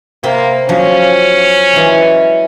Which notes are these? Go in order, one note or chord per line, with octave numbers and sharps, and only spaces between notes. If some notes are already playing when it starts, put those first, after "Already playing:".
C3 A#3 C4 B5
F3 F#3 C#4
E3 F#3 G#3